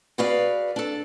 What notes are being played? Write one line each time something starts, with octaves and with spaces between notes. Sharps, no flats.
F#4 G#4 B4 D5 F5
D4 A4